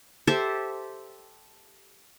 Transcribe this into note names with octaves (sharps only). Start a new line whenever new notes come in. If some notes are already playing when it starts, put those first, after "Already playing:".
G4 A4 C5 E5